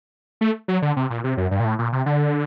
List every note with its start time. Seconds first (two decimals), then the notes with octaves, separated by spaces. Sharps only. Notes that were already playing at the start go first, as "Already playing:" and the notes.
0.41 A3
0.68 F#3
0.82 D3
0.97 C3
1.10 A#2
1.24 C3
1.37 F#2
1.51 G2
1.60 A#2
1.65 A2
1.79 A#2
1.92 C3
2.06 D3